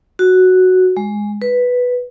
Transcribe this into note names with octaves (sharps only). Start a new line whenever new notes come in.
F#4
G#3
B4